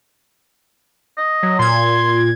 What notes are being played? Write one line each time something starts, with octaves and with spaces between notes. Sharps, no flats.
D#5
F#3
A#2 C6 G#6